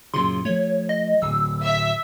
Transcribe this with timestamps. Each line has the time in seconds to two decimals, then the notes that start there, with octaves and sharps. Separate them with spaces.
0.14 F#2 A#2 C#3 C6
0.45 F3 A3 C#5
0.89 D#5
1.22 D1 E6
1.63 E5